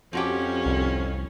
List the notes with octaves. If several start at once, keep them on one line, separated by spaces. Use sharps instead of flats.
F2 F3 C#4 F#4 G4
C2